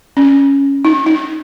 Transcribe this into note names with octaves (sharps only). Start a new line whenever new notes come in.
C#4
D#4
D#4